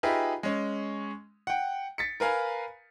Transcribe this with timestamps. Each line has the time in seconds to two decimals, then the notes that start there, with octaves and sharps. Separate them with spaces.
0.03 D#4 F4 G4 G#4 B4 E5
0.43 G#3 C#4
1.47 F#5 G5
1.98 A6 B6 C#7
2.20 A#4 B4 F5 G#5 A#5